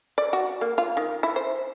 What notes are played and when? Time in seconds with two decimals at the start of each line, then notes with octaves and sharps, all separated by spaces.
0.18 D5
0.33 F#4
0.61 A#3
0.78 F4
0.97 D#3
1.23 E4
1.36 C5